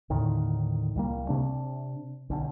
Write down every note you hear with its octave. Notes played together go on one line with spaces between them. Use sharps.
D#2 A2 D3 D#3
C2 G3 A#3
C3 D4
B1 D3